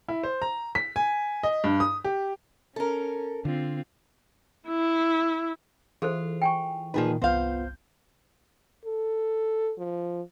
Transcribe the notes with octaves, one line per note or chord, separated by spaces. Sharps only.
E4
C5
A#5
B6
G#5
D#5
G2
D#6
G4
C#4 A4 A#4
D3 C4 F4
E4
E3 F4 G#4 A4 C5
G5 G#5 C#6
A#2 D#3 F3 D#4 G#4 B4
G1 C2 B3 F4 C5 F5 G6
A4
F3